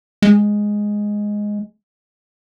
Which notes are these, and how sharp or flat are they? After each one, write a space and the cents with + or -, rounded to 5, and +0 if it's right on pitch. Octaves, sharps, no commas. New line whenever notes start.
G#3 +0